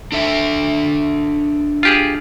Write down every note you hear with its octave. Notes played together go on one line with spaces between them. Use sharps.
D4 A4 E5
F4 G4 G#4